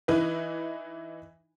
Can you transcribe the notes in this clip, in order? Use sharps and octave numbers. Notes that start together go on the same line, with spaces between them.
E3 D#4 E4 B4